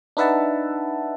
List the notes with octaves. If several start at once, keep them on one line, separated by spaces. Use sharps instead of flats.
D4 D#4 B4 E5 F#5 A5